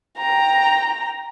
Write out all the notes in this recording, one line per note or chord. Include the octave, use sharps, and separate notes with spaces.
G5 A#5